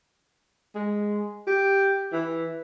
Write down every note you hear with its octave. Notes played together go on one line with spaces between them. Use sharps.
G#3
G4
E3